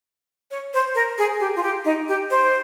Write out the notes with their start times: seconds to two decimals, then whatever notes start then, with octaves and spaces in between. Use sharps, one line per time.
0.51 C#5
0.74 C5
0.95 A#4
1.18 G#4
1.40 G4
1.56 F4
1.63 G4
1.85 D#4
2.08 G4
2.31 C5